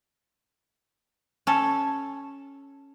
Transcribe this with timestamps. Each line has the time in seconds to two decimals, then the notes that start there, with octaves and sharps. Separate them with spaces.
1.47 C#4 A4